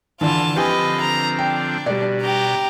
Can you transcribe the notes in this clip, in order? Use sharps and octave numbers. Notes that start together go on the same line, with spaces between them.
D3 E3 F4 A5
D3 F3 C4 G4 B4 D#5 G#5
A#5
D4 G5
B2 G3 D5
G4 A#5